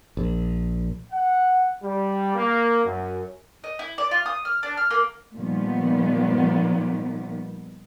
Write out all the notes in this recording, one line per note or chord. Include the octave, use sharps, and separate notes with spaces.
A#1
F#5
G3
A#3
F#2
D#5
E4
D5
F4
D#6
F6
D4
F6
A#3
A#2 D#3 F3 G3 B3